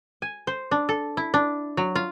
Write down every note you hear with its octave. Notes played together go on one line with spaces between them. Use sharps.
G#5
C5
D4
A4
E4
D4
F#3
F4